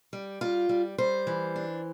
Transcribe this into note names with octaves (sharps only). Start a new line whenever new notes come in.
G3
G3 F4
G3
G3 C5
E3
D4